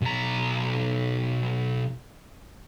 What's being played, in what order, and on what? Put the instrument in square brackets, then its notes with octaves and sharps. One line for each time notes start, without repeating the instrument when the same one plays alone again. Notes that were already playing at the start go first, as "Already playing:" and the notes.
[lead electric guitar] B1 A#5